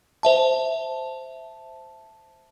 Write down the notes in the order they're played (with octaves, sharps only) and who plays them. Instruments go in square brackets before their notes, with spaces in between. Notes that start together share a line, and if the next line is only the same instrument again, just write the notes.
[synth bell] C5 E5 A5